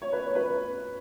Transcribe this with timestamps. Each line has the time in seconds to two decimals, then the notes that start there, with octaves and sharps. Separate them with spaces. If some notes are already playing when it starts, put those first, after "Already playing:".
0.02 C#5
0.13 B4
0.24 C#5
0.35 B4